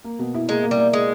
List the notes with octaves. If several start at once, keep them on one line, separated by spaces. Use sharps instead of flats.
A#3
B2
E4
G#3 A#3
A#3
G3
A#3
G#3